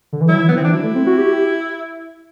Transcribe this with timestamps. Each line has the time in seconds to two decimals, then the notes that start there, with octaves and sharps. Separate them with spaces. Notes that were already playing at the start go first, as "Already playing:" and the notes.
0.13 D3
0.21 E3
0.29 F#3 E4
0.40 E3
0.49 D3 B3
0.57 C4
0.61 E3
0.64 D4
0.73 F#3 E4
0.83 A3
0.95 C4
1.07 F#4
1.18 G4
1.32 G4